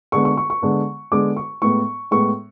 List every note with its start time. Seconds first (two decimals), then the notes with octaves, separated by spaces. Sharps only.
0.12 D3 G#3 B3 C#6
0.25 C#6
0.37 C#6
0.50 C#6
0.62 D3 G#3 B3
1.12 D3 G#3 B3 D6
1.36 C#6
1.62 A2 G#3 B3 C#6
2.11 A2 G#3 B3 C#6